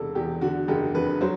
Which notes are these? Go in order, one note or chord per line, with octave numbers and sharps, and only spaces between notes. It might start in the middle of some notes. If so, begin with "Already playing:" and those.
Already playing: E1 C3 A4
E2 G4
D3 F#4
F#1 G4
F2 B4
F#3 C5